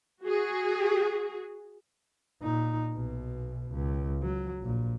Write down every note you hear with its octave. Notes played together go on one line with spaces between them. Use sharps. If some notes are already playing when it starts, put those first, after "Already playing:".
F#4 G#4
A#2 D#4
B1 B2
C#2
F#3
A#1 A#2